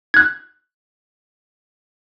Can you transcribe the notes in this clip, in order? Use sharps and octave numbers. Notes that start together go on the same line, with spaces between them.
F#6 G#6